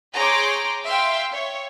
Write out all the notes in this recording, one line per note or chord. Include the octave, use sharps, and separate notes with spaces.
G#4 C#5 G5 A#5 C6 D6
E5 F5 G5 C6
C#5